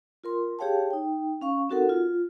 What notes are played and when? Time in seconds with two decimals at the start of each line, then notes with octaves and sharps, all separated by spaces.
0.24 F4 A#4 C6
0.59 G4 G#4 C#5 F5 G5 A5
0.91 D#4 G5
1.41 C#4 F5 C#6
1.69 C4 D#4 F#4 A4 A#4 F#5
1.89 F4